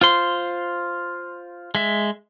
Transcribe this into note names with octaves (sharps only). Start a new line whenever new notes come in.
F4 C5 C6
G#3 E5